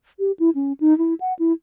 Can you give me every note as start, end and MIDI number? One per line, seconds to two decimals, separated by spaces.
0.19 0.31 67
0.39 0.50 64
0.55 0.73 61
0.80 0.96 63
0.98 1.14 64
1.20 1.33 78
1.39 1.52 64